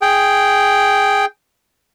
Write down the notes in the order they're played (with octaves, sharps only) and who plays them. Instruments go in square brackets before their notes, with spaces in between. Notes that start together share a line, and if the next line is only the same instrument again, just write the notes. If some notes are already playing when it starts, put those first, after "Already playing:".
[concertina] G#4 G5